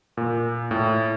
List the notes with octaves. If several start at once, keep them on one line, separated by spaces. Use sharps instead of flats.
A#2
A2